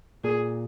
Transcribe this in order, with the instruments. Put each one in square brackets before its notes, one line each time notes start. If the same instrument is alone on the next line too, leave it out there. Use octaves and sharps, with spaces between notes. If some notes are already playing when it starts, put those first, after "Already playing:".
[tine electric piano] A#2 [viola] G#4